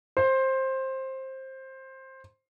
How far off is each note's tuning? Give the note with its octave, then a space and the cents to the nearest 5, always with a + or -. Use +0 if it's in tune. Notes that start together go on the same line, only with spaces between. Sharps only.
C5 +15